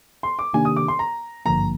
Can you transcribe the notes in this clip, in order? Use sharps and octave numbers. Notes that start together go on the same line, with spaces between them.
C6
D6
C3 D#3 A#3 D4 G4 G#5
D#6
D6
C6
A#5
G#1 G2 D3 F3 A#3 A#5